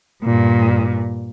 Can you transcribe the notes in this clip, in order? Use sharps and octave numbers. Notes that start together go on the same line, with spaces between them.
G2 A#2